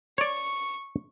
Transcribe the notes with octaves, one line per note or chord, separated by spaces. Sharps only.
C#5 D5 C#6